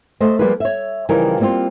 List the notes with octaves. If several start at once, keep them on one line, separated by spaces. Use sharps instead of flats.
A3 C5 D#5
F3 G3 A#3 F4 G#4 B4
C#5 E5
C#3 E3 F3 G3 D#4 A#4
G3 A#3 C4 D#4 F4